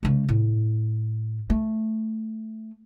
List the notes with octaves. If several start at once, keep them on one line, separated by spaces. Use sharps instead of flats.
C#3 G#3
A2
A3